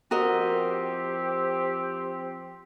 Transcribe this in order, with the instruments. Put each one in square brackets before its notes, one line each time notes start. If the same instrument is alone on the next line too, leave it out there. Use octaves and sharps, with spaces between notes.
[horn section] F3 C4 G4 [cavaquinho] F#4 A#4 D#5